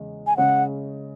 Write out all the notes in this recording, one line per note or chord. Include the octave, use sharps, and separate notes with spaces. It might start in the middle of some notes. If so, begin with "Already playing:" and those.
Already playing: E2 C#3 G#3
G#5
C#3 G#3 C#4 F#5